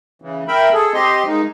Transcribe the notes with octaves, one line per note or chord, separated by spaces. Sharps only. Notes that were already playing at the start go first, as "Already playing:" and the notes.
C#3 E3
A#4 E5 G5 B5
G#4 A4
C4 G4 D#5 C6
G#3 A#3 D#4